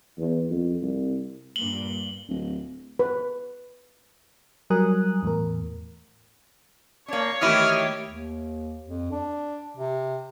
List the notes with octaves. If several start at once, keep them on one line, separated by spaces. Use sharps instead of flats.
E2
F2
C2
G2 A#2 F#7 G7
D1
B4
F#3 G3 A#4 G#5 D#6 F#6
E2 A2 A#4
A#3 D4 C#5
D#3 E3 A3 E4 G4 D#6 F6
D#2
F2
D4
C3